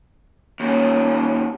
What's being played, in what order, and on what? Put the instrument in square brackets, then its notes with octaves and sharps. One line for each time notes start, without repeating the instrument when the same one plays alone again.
[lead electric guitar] D#2 C#4